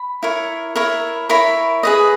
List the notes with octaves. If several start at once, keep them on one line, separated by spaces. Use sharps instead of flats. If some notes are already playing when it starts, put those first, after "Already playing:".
Already playing: B5
E4 A#4 C#5
E4 A#4 C#5
E4 A#4 C#5 B5
G#4 B4 D#5